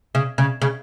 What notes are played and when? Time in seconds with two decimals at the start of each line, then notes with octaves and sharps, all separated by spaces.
0.15 C#3
0.38 C#3
0.62 C#3